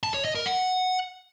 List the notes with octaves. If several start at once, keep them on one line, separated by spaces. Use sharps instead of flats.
A5
C#5
D#5
A#4
F#5